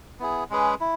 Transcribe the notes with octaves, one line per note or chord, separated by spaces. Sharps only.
B3 E4 G#4
G#3 C#4 G#4 B4
E4